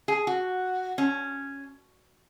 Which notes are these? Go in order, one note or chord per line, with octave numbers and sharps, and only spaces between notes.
G#4
F#4
C#4